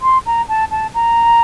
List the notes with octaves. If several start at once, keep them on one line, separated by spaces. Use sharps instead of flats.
C6
A#5
A5
A5
A#5